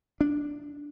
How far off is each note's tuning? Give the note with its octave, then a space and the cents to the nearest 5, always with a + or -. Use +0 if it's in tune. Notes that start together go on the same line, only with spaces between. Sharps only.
D4 -5